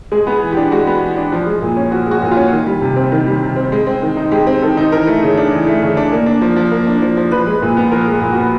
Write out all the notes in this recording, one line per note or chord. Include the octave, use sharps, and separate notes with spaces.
G#3 G#4
B3
G#4
E3
G4
D4
G#3 F#4
B3
E3
D4
F3
G#3
A#2
C#4
F3 F#4
G#3 F#4
A#2
F4
C#4
D#3
G3
C3
C4
D#3
G3
C3
C4
G#3
C4
D#3
D#4
G#3 G4
C4
D#3 A4
D#4
E3 A#4
A3
C#3
D4
E3
A3
C#3
D4
A#3
D4
F3
F3
A#3
D4
F3
F3
F3 B4
G#3
A#2
B3
F3 A#4
G#3
A#2
F#4
B3